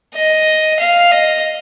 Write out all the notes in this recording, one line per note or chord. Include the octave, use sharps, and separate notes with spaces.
D#5
F5
D#5